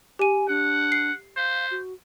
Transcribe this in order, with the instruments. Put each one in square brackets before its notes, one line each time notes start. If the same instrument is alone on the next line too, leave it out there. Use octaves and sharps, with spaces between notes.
[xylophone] G4 D#7 [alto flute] G#5
[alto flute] D4 [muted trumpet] F#5
[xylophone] C7
[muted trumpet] C5 [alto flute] F5
[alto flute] F#4